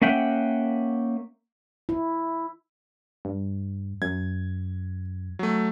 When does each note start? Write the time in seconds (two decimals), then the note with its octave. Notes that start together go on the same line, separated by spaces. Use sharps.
0.02 A#3 C#4 E5 F#5 G5
1.89 E4
3.25 G2
4.02 F#2 G#6
5.39 F#3 A3